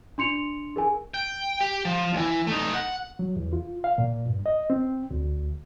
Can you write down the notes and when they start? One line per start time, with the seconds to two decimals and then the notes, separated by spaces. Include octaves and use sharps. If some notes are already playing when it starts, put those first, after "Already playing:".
0.18 D4 C6 C#7 F7
0.76 G#4 A#4 G#5
1.14 G5
1.61 G4
1.85 F3
2.13 D#2 E3
2.47 A3 D#4
2.74 F#5
3.19 F#3
3.36 E2
3.53 F4
3.84 F5
3.98 A#2
4.26 G2
4.46 D#5
4.70 C4
5.11 D2